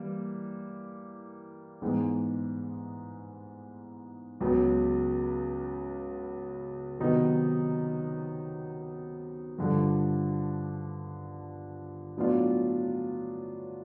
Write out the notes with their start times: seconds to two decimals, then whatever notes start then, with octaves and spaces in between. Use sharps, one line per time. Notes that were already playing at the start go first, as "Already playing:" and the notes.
Already playing: E3 G3 A#3
1.82 G#2 E3 G#3 B3
4.40 C#2 C#3 F#3 B3
7.00 C3 D#3 F#3 B3 D#4
9.58 G2 D3 F3
12.17 A2 F#3 B3 D4 F4